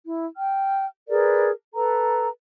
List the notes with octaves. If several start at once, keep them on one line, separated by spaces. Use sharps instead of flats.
E4
G5 F6
G#4 A#4 B4 D5
A4 B4 A#5